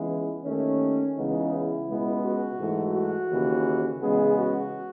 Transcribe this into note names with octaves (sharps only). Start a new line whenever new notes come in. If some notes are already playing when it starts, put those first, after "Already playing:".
Already playing: C#2 C#3 E3 G#3 B3 E4
D#2 D#3 A3 C#4
C#2 C#3 E3 G#3 B3 D#4
E4
C#2 B2 G#3 B3
F#4
G#2 E3 A3
F#4
D#2 C#3 E3
E2 C#3 G#3 B3 G#4
F#4